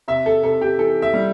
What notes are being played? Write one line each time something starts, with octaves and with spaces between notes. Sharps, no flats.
C3 E5
A4
C3 A4
G4
E3 A4
E5
G3